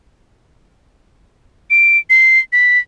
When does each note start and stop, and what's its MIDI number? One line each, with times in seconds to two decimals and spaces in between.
1.70 1.98 98
2.10 2.39 96
2.52 2.78 95